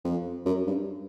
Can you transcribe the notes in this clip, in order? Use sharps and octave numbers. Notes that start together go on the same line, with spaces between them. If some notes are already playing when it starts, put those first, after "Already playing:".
F2
F#2
G2